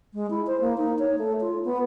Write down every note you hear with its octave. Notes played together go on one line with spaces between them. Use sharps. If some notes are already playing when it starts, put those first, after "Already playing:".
G#3
E4
C5
A#3
D#4
C#5
A3
F4
B3